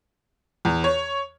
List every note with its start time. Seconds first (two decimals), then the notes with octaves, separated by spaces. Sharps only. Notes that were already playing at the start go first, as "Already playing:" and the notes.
0.65 E2
0.84 C#5